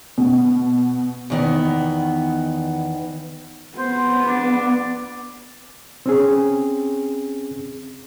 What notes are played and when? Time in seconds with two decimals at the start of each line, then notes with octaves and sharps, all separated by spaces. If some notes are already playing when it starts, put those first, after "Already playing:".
0.18 B2
1.30 E2 D#3 B3
3.78 B3 C5
4.27 D4
6.06 C4 C#4 G#4